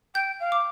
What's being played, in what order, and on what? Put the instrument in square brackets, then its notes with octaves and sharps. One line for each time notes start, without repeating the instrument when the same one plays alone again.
[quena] G5 [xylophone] G6
[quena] F5
[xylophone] D6